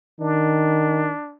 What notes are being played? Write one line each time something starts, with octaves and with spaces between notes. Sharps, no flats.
D#3 D4